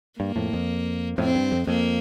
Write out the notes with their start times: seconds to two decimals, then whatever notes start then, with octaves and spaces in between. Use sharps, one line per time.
0.19 G2 A#3
0.36 F2 A2
0.53 F2
1.18 F2 A2 C4
1.35 G2
1.52 F2
1.67 F2 A#3